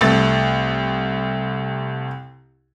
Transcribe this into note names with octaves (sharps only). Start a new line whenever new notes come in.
C2 A3 A6